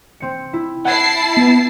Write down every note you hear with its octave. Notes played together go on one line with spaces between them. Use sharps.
C4 C#7
E4
E4 F#5 A5 G#6 C7
B3